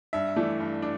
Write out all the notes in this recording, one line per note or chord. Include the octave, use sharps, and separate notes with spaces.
G2 E5
E3 A3 D4
G2
D4